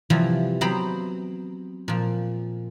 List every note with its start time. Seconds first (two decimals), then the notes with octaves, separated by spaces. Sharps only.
0.10 C3 E3 F3 G3
0.61 F#3 B3 C4 C5 A#5 B5
1.88 A#2 F3